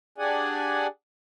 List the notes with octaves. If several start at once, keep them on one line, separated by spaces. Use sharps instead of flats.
D4 G4 G#4 D5 F#5 G#5